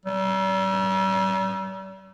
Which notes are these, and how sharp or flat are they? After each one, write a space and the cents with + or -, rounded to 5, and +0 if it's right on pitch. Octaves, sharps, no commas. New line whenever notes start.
G3 -40